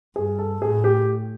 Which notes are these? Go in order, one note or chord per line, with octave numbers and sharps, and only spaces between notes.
G2 G#4
A4
A2 G#4
G4